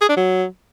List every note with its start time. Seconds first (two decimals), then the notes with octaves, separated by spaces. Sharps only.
0.01 G#4
0.09 D4
0.17 F#3